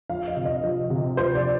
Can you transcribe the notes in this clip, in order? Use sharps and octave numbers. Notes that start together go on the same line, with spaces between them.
F3 F5
D#5
C3
D#5
F3
C3
F3 C5
D5